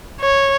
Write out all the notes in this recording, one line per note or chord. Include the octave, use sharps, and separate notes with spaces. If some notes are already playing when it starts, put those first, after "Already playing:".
C#5